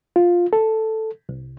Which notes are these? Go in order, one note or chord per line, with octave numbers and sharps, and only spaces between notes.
F4
A4
C2